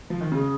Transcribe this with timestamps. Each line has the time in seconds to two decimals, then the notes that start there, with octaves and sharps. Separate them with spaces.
0.10 F3
0.21 D#3
0.32 C#3 G#4